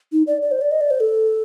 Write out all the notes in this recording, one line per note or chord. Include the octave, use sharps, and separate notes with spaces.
D#4
D5
D5
C5
D5
D#5
D5
C5
A4